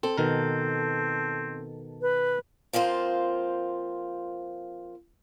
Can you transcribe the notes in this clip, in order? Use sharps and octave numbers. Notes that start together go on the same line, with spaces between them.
C4 A4
B2 D#3 C4 A#4
B4
F3 A#3 C4 F4 C5